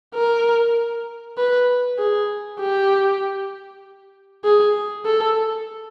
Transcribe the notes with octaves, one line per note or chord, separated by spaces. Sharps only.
A#4
B4
G#4
G4
G#4
A4